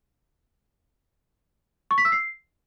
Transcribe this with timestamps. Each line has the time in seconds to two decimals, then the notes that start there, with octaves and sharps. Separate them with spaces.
1.91 C#6
1.98 B6
2.05 E6
2.12 C7